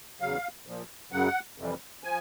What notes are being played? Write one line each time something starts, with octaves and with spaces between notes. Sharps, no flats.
E2 C#3 F#3 F5
A#2 F3
F#2 C#3 F#3 F#5
F2 C3 E3 G3
F3 G#5